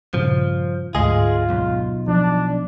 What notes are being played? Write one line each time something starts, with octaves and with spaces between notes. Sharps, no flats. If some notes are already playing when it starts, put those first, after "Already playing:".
G2 A#2 C#3 F3
D2 G#2 G#3 F4 G#4
B1
F3 D4